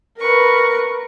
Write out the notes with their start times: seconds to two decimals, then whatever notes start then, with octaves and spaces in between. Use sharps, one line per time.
0.19 A#4 B4 C#6